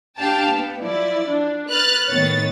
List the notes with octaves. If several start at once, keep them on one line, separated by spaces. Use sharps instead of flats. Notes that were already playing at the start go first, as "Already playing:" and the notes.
D4 G4 F5 G5 A5
B3
F3 E4 D5
D4
B4 F6 F#6 A6
A2 D#3 B3 C#5 A6